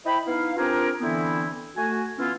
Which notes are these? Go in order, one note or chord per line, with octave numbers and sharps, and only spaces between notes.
E4 C5 D#5 G5 B5
B3 D#4 E4 F5
C4 D4 F4 G4 G#4 A#4
D3 E3 B3 C4 E4
A3 F#4 G#5
E3 B3 C#4 E4 F4